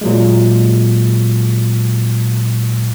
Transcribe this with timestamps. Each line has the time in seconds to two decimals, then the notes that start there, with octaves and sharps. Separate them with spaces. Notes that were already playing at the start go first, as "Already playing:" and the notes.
0.01 A#2 F#3 G#3